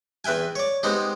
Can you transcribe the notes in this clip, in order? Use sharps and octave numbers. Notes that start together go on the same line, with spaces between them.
E2 B4 E5 G5 G#5
C#5 D5
G#3 B3 C4 D#4 G4